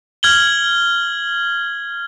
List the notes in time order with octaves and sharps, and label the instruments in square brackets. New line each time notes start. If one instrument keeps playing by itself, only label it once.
[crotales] F6 G#6 F#7 G7